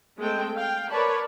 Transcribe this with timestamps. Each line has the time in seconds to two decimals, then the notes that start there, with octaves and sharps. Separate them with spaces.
0.18 G#3 A3 C4 G5
0.56 F5 G5
0.90 A#4 B4 C#5 D5 A5 B5